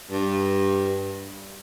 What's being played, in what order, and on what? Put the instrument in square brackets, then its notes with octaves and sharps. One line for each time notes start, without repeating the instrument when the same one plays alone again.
[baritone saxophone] G2